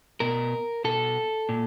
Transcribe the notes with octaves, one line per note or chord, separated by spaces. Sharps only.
B2 A#4
B2 A4
A#2